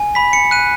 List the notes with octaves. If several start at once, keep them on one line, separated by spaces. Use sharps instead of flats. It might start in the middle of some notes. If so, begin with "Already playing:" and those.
Already playing: G#5
B5 B6
C#7
F#6 D#7